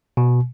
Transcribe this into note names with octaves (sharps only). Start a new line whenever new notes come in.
B2